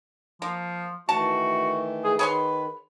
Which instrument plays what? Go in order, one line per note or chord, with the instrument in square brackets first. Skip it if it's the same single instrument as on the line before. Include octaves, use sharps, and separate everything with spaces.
[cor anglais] F3 [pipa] A#3
[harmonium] D#3 E3 A3 [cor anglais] F#4 [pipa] A5
[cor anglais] G#4
[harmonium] D#3 [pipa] G#4 C#5 C6 [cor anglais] B4